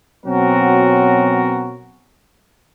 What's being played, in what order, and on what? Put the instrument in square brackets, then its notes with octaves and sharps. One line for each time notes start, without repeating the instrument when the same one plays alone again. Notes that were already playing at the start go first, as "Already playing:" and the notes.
[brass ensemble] B2 F#3 C4 C#4 F#4 A#4